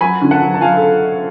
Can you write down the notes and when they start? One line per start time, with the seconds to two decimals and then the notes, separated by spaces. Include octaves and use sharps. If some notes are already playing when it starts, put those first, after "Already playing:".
0.01 F#3 G#5 B5
0.22 D3
0.31 F#5 A5
0.42 F#3
0.54 A5
0.61 F#3 F5 G#5
0.77 A4